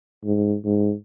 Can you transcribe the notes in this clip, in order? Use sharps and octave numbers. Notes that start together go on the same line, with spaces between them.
G#2
G#2